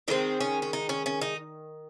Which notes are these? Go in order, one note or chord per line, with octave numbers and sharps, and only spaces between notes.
D#3 G#3 C4 D#4
C#4
C#4
D#4
C#4
C#4
D#4